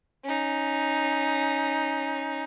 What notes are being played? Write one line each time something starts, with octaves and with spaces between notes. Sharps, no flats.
C#4 D#4